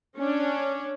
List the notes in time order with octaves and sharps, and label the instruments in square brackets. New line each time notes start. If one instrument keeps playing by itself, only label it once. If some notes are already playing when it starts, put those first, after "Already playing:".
[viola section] C#4 D4